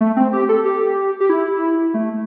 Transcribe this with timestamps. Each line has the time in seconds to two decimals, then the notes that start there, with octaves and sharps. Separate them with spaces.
0.01 A3
0.17 C4
0.33 G4
0.49 A4
0.65 G4
1.20 G4
1.29 E4
1.94 A3